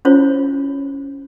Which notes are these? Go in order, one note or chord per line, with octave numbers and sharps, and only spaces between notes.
C#4 E4 F4 C5 C#5